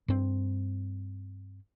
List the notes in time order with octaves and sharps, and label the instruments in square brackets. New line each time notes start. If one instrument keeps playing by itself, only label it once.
[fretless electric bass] G2 C4